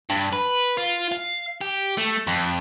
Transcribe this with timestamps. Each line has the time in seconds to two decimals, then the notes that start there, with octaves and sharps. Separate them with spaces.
0.10 G2
0.33 B4
0.77 F4
1.12 F5
1.61 G4
1.98 A3
2.27 F2